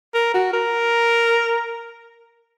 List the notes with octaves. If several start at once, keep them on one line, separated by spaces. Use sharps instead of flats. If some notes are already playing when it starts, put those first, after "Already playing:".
A#4
F#4
A#4